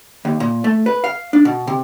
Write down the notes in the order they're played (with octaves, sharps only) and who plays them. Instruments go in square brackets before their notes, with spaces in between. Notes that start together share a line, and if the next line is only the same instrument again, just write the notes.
[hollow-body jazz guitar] D#2
A#2
A3
B4
F5
D4
B2
C3